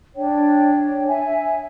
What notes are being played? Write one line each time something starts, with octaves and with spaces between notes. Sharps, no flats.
D4 C#5 G5
E5 G#5